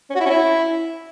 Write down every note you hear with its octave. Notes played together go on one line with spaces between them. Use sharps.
C#4
F#4
E4
C#4
E4